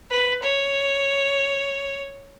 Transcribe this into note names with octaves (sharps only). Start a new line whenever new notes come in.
B4
C#5